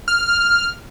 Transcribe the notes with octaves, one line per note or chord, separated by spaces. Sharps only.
F6